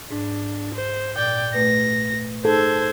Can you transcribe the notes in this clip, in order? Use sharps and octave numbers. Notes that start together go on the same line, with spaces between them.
G#2 D4
C5
A#2 D5 G5
A#2 A3 B4 A#6
D#4 G#4 A4 C5 G#6